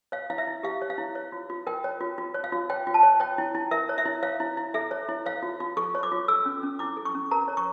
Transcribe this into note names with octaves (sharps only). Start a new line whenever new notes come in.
C#5 F5
E4 F5
E5
E4
G4 F5
C#5
F5
E4
C#5
F4
F4
A#4 G5
C#5
F4
F4
C#5
F5
F4
C#5 G5
F4
A5
C#5
C#5 G5
E4
E4
A#4 E5
C#5
E5
E4
C#5 F5
E4
E4
A4 E5
C#5
E4
C#5 F5
F4
F4
A4 C#6
C#5
D6
F4
A4 E6
C#4
C#4
E4 D6
A4
C#6
C#4
A#4 A#5
C#5
C#6